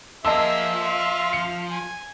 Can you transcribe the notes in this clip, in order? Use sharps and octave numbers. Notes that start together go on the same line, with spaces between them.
F3 A#3 G#4 D#5 E5 A5 E6
F5
C#7
G#5